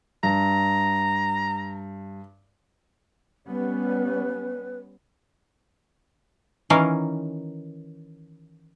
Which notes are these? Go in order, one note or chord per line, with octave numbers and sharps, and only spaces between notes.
G2 A#5
G3 B3 C#4 B4
D#3 E3 C#4 A#4 F5 G#5